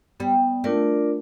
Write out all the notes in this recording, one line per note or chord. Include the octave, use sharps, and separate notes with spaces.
G3 B3
A3 D4 F4 A#4 D5